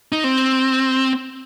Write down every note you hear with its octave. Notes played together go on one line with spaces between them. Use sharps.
D#4
C4